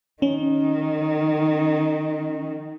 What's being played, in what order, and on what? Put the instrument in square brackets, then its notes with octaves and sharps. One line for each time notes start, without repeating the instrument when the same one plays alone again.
[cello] D#3 [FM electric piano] C#4